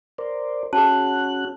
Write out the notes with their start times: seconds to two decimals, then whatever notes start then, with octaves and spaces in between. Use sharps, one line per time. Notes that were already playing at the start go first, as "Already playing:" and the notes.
0.18 A#4 C5 D5
0.73 C#4 F#4 G#4 A5 F#6